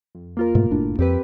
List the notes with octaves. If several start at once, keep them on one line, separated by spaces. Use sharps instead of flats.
F2
A#3 F4 A#4
G#2 B2 A3
F#1 A2 D4
F2 C4 G4 B4